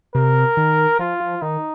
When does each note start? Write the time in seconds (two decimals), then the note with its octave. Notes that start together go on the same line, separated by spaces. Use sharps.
0.15 C3 A#4
0.57 D#3
0.99 F3 F4
1.20 F3
1.42 D#3 D#4